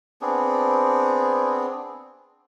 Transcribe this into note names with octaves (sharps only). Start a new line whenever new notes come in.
B3 C4 D4 G#4